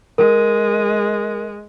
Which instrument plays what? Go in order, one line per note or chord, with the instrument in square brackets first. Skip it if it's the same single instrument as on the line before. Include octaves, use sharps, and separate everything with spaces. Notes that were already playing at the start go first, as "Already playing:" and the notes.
[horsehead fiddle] G#3 [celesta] A#4